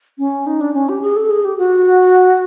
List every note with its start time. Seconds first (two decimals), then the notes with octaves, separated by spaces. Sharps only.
0.19 C#4
0.47 D#4
0.61 D4
0.74 C#4
0.89 G4
1.02 G#4
1.16 A4
1.31 G#4
1.45 G4
1.58 F#4